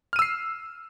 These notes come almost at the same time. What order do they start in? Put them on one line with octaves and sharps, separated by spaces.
F6 D#7 E6 C7